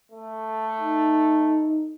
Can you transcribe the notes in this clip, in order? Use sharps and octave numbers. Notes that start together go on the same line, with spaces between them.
A3
D#4